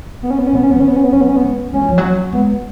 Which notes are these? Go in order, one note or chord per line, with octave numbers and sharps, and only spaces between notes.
B3
C#4
B3
C#4
B2 B3
C#4
D#3 B3
C#4
B3
C#4
B3
F#3 C#4
B3
C#4
B3
G#3
G#3 C#4
F#3
F3
F#3
G#3 B3